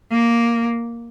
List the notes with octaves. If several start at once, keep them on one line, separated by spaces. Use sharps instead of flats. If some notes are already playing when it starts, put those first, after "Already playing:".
A#3